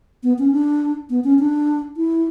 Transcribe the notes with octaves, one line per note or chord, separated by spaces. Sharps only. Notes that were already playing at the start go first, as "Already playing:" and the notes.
B3
C#4
D4
B3
C#4
D4
E4